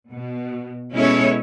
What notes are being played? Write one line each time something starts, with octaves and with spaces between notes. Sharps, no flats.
B2
B2 G#3 C#4 E4 A4 C#5